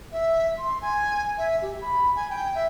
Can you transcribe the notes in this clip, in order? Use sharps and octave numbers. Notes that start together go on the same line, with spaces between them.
E5
C6
G#5
E5
G4
B5
G#5
G5
E5